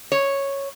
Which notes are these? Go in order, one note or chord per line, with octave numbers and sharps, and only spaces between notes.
C#5